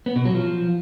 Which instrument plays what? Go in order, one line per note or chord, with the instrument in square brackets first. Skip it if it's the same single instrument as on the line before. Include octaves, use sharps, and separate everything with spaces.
[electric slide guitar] B3
B2
F#3
F3